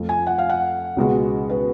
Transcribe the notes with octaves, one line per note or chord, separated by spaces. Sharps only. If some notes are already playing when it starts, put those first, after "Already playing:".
Already playing: F2 F3 A3
G#5
F#5
F5
F#5
C#2 B2 G#3 B3 F#4
B4